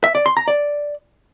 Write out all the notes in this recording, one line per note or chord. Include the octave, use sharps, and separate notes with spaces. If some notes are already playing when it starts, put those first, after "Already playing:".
E5
D5
C6
A#5
D5